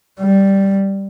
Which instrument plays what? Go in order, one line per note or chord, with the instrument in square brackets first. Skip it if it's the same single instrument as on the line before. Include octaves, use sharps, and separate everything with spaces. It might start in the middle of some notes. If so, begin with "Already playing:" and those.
[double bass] G3